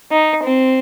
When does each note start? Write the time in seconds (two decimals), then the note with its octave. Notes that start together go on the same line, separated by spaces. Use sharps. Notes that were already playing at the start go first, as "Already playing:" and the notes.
0.11 D#4
0.44 C4